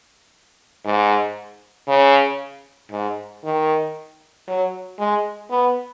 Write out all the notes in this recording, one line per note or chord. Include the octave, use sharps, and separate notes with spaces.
G#2
C#3
G#2
D#3
F#3
G#3
B3